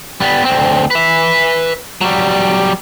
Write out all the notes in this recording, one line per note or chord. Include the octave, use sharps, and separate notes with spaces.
G3 B3
D2 C4
B4 E5
F#3 G3